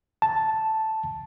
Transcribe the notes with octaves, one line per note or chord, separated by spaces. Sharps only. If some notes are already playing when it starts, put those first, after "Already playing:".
A5